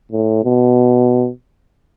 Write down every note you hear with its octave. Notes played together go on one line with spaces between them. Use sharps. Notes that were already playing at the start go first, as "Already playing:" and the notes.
A2
B2